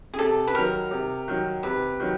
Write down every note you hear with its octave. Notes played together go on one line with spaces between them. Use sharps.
G#4
C3 A4
B4
D#3 F#3 A#4
C3
D#3 F#3
C3 B4
D#3 F#3